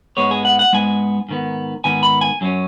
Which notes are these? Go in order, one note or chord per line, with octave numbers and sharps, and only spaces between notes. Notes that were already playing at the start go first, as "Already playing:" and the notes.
G#2 G#3 B3 C#5
G#4
F#5
F#5
G#2 G#3 B3 G#5
G#2 D#3 B3
G#2 D#3 B3 G#5
B5
G#5
F#2 F#3 C#4